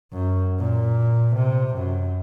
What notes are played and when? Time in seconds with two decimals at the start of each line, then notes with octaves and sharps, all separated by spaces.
0.13 F#2
0.59 A#2
1.35 C3
1.75 F#2